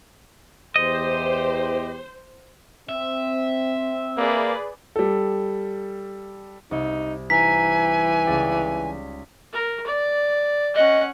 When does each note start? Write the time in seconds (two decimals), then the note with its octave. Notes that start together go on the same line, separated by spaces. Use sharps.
0.76 E2 G4 C5 D#5
2.89 C4 E5
4.17 A#3 G#4 B4 D5
4.96 G3 A4
6.71 C2 D#4
7.30 E3 D#4 G#5 A#5 B6
8.26 C#2 D5 G5
9.53 A#4
9.86 D5
10.76 C#4 D#5 F#5